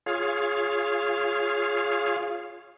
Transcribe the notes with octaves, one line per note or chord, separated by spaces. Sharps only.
F4 G#4 C#5 F5